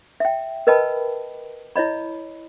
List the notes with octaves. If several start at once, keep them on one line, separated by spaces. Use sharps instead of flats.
E5 G5
A#4 B4 D#5 G5 A5 B5
E4 C#5 D#5 B5